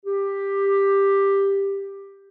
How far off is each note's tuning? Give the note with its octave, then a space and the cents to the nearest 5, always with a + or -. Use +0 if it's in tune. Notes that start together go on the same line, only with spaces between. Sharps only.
G4 +10